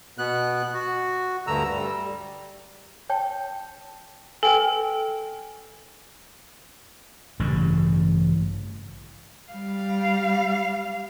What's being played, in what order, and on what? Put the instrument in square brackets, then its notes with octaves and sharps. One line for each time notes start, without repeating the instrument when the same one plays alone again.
[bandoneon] B2 B3 F#6
F#4
D2 G2 D3 A#5 E6
G3
[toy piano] C#5 G5 A5
[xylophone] A4 G5 [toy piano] B4 G#5
[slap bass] A1 G2 C#3
[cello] G3 F5